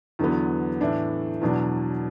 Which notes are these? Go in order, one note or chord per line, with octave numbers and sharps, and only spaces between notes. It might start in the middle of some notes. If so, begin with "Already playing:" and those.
E2 D3 F#3 B3
A2 E3 D4
E2 B2 F#3 D4